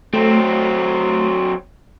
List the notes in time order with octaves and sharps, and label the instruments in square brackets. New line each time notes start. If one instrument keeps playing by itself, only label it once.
[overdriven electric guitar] F#3 C4 [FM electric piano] A3